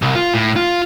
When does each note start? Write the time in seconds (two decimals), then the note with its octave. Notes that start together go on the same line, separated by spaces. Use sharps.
0.02 C2
0.15 F4
0.34 A2
0.56 F4